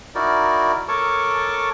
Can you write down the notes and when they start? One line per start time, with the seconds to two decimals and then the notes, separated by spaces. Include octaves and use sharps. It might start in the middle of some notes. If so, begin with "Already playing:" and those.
0.15 D#4 E4 F#4 A#4 D5
0.88 A4 A#4 C#5 A5 C#6 D6